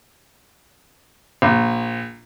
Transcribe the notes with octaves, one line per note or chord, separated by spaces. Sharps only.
A#1